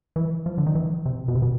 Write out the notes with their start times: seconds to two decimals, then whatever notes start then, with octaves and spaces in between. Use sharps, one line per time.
0.16 E3
0.46 F3
0.58 D3
0.67 D#3
0.75 E3
1.06 C3
1.28 B2
1.35 C3
1.42 B2